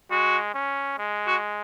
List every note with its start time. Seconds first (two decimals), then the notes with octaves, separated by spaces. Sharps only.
0.11 G#3 F#4
0.54 C#4
0.98 G#3
1.27 F#4